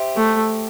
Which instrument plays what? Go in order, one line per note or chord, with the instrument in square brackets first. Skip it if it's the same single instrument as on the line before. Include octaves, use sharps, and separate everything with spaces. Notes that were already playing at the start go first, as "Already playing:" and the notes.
Already playing: [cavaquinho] G4 C5 E5
[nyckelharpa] A3